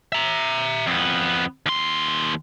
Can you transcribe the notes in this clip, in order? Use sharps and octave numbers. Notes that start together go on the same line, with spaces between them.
E5 A#5
F2 B3
D#2 C6